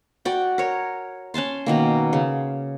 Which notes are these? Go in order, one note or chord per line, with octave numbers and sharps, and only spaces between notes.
F#4 D5 G5
A#4 C#5
C#4 G#5 A5 C6
B2 D#3 A#3
C#3